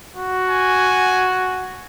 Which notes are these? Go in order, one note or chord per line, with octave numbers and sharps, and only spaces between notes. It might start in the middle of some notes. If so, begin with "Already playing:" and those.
F#4
G#5